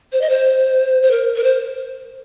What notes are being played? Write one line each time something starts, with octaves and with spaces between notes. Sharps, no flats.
C5
D#5
C5
C5
A#4
A#4
C5